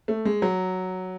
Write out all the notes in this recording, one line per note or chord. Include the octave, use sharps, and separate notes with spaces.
A3
G#3
F#3